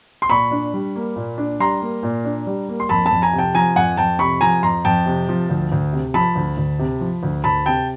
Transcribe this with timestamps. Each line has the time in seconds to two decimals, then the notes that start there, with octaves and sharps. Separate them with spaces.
0.22 C6
0.30 A#2 B5 C#6
0.51 D4
0.74 G3
0.96 A#3
1.16 A#2
1.38 D4
1.60 G3 A#5 C6
1.82 A#3
2.03 A#2
2.25 D4
2.47 G3
2.69 A#3
2.80 C6
2.89 F2 A5 B5
3.06 A5 B5
3.11 F2
3.22 G#5 A#5
3.33 C3
3.39 G5 A5
3.54 F3 G#5 A#5
3.76 F2 F#5 G#5
3.97 F2 G5 A5
4.19 C3 B5 C#6
4.41 F3 G#5 A#5
4.63 F2 A#5 C6
4.85 F2 G5 A5
5.06 C3
5.28 F3
5.49 D2
5.72 D2
5.93 C3
6.14 F3 A5 B5
6.36 D2
6.57 D2
6.79 C3
7.01 F3
7.23 D2
7.44 D2 A5 B5
7.66 C3 G5 A5